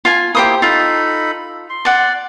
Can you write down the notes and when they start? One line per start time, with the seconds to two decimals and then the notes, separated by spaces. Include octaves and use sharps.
0.05 F4 G#5
0.35 A#3 E4 G4 C5 D#6
0.62 D#4 F4 A4 B5
1.70 C6
1.85 D5 F#5